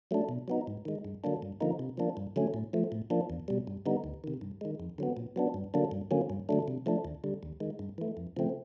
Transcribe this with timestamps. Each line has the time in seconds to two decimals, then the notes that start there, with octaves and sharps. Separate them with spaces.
0.11 F#3 A3 D4
0.29 B2
0.48 F#3 B3 D#4
0.67 G#2
0.85 D#3 G#3
1.05 G2
1.24 D3 F#3 A#3 D4
1.42 G2
1.61 D3 F3 A#3 D#4
1.79 C3
1.98 F3 A#3 D4
2.17 G2
2.36 D3 F#3 A3 C#4
2.54 A2
2.73 F3 A3
2.92 A2
3.10 F3 A#3 D4
3.30 E2
3.48 B2 G3
3.67 G2
3.86 D3 G3 B3 D#4
4.04 D2
4.24 C3 D#3
4.41 G2
4.61 D#3 G#3
4.80 F2
4.98 D3 F#3 B3
5.17 A#2
5.36 F#3 B3 D4
5.54 G2
5.74 D3 F#3 A#3 D4
5.91 G2
6.11 D3 F#3 A#3 C#4
6.30 G2
6.49 D3 F#3 A3 D4
6.68 C3
6.86 F3 A3 D4
7.05 D#2
7.24 D3 G3
7.43 D#2
7.60 D#3 G#3
7.79 G2
7.98 E3 A3
8.17 F2
8.37 C#3 F3 A3 C4